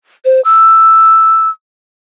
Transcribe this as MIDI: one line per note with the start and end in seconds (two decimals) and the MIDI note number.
0.25 0.41 72
0.44 1.49 88